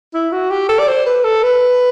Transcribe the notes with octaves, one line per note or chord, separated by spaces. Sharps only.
E4
F#4
G4
A4
D5
C5
B4
A4
B4